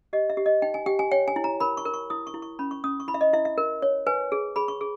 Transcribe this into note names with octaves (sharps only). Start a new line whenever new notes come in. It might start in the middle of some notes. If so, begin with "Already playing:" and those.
G4 D#5
E5
G4
D#5
D#4 G5
G#5
G4 G5
G#5
C#5 G5
G#5
E4
A#5
A#4 B5
C#6
A#4
C#6
E4 D#6
C#6
E4
C#6
C#4 B5
C#6
C#4 D#6
C#6
E4 B5
E5
D#5
E4 E5
E5
A#4
C#5
B4 G#5
G#4
G#4 B5
C#6
G#4